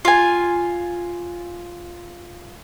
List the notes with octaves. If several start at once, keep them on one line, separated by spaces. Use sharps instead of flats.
F4 G#5